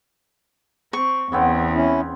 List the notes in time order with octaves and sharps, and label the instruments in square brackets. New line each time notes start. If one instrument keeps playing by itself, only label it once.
[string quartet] C4 [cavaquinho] C#6
[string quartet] E2 [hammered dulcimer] C#3 B3 C4
[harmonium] C#4 E4